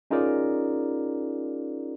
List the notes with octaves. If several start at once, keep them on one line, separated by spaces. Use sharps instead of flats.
C#4 D#4 F4 G#4 A#4 D5